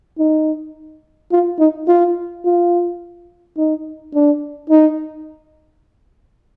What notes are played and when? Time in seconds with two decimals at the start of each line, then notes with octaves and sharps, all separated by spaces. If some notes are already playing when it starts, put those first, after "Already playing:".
0.18 D#4
1.32 F4
1.59 D#4
1.88 F4
2.45 F4
3.57 D#4
4.14 D4
4.70 D#4